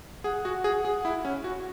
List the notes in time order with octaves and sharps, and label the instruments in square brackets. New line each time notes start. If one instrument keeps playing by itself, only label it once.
[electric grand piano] G#4 [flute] F#5
[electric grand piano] F#4
G#4
G#4
E4
C#4
F#4